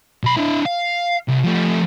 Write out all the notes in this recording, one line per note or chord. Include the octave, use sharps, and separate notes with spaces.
B1 B5
D4 E4
F5
C2
F3 A3